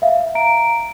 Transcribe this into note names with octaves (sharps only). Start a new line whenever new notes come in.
E5 F5
A#5 D7